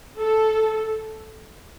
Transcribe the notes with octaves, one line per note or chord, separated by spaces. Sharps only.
A4